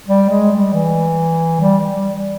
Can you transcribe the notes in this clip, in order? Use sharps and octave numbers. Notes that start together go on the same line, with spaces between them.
G3
G#3
G3
E3
G3
G3